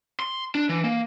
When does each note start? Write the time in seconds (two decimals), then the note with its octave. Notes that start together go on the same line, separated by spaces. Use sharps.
0.20 C6
0.55 D4
0.69 E3
0.84 A#3